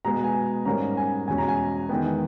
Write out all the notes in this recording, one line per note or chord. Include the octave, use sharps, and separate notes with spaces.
B2 G#3 B3 A#5
G#5
G#2 G3 A#3 C#4 A#5
G#5
E2 B2 G#3 C#4 G#5
A#5
G#5
E2 D#3 G#3 B3 G5